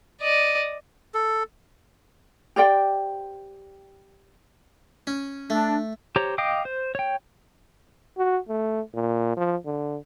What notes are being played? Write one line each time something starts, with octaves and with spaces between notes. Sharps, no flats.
D5 D#5
A4
G4 C5 D5 G5
C#4
A3 D4
G4 C5 C#5 A#5
D#5 F5 G5 D6 D#6
C5
C#5 G5
F#4
A3
A#2
F3
D3